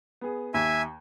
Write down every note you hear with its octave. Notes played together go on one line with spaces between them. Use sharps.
B3 G#4
D#2 E5 G#5